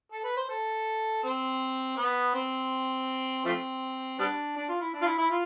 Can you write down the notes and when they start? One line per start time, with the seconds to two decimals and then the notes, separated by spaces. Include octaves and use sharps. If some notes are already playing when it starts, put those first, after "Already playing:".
0.12 A4
0.24 B4
0.37 C5
0.49 A4
1.23 C4
1.97 B3
2.34 C4
3.45 F3 A3 C4
4.19 G3 B3 D4
4.56 D4
4.69 F4
4.81 E4
4.94 D4
5.02 F4
5.06 E4
5.18 E4
5.30 F4